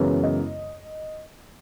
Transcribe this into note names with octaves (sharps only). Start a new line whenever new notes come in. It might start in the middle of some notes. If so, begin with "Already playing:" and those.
Already playing: F#2 C#3 E3 G#3 B3
D#5